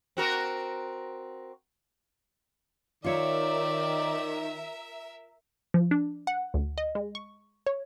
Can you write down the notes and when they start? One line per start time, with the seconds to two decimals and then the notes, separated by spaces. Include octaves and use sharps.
0.17 C4 F#4 A#4
3.04 D#3 F4 A#4 C#5 D5 E5
5.74 F3
5.91 D4
6.27 F#5
6.54 D2
6.78 D#5
6.95 G#3
7.15 C#6
7.66 C#5